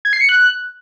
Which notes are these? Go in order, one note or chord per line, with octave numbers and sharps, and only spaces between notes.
G#6
C7
C#7
F#6